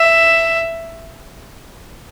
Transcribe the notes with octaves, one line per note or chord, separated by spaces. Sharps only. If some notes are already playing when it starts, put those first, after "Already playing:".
Already playing: E5